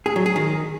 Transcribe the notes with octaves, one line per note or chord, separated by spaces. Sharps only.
G#4
F#3
G#4
D#3